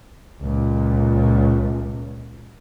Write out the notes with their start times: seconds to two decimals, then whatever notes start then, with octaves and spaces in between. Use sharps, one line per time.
0.41 C#2 A#2